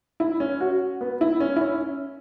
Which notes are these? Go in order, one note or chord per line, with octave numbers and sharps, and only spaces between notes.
E4
C#4
F#4
B3
E4
C#4
E4
C#4